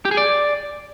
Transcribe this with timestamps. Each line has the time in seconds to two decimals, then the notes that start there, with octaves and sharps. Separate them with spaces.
0.05 G4
0.11 G#4
0.17 D5